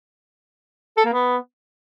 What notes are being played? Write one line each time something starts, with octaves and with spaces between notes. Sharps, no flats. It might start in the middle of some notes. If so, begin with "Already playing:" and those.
A4
A#3
B3